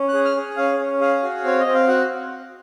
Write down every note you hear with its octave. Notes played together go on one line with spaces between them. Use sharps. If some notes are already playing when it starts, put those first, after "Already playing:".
Already playing: C#4
G#4 F#6
F6
G#4
C#4 F5
C#4
G#4 F5
F#4
C4 C#5
D#5
C4
F5
F#4 F#5